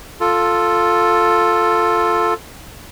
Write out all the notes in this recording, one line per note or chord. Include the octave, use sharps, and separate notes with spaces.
F4 A4